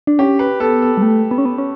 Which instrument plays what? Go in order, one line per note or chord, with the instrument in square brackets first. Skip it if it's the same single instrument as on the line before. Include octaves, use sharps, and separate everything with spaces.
[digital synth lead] D4
[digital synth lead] C#4 [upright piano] G4
[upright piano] B4
[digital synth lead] B3 [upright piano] A4
[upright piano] A4
[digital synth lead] G3
A3
B3
C#4
B3
C#4